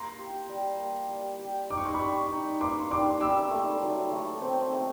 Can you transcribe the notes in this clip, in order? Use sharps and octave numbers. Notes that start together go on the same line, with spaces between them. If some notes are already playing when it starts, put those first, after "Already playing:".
Already playing: A#3 A#5 C6
G4
G3
A#3
G3
G4
D#4 D6
C#6
C6
B5 C#6
G3
D#4
A#3 C6 D6
G3 C6 D6
G3 D6 E6
A3
F#3
A3
C4
A3